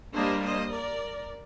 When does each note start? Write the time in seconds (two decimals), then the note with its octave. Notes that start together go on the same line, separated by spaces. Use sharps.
0.15 G3 A#3 D4 C5 D#5
0.44 C5 D#5
0.72 A#4 D5